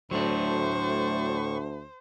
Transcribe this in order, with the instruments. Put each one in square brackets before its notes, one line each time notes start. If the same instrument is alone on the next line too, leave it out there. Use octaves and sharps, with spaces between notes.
[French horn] D2 [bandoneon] A2 C#6 [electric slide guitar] F#3 D4 [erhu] C5